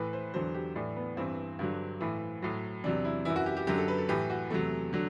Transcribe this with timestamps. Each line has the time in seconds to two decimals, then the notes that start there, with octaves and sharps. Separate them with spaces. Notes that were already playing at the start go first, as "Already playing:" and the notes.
Already playing: A2 E3 B4
0.13 C5
0.34 E2 D3 F#3 C5
0.55 G4
0.75 A2 E3 D4
0.96 B3
1.17 G2 E3 C4
1.59 G2 D3 F#3
2.01 A2 E3
2.42 A2 F#3
2.84 E2 C3 F#3 D4
3.05 E4
3.25 F#2 E3 E4
3.36 F#4
3.46 G4
3.57 G4
3.67 F#2 D3 F#3 G4
3.78 A4
3.88 B4
3.98 A4
4.09 A2 E3 G4
4.30 F#4
4.50 E2 C3 F#3 A3
4.93 D3 F#3